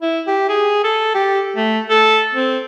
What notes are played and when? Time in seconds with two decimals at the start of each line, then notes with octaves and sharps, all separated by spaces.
0.02 E4
0.27 G4
0.49 G#4
0.84 A4
1.15 G4
1.56 A3
1.90 A4
2.34 C4